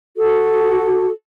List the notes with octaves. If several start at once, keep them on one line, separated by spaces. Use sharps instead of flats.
F#4 A4